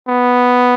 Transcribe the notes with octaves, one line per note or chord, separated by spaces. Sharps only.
B3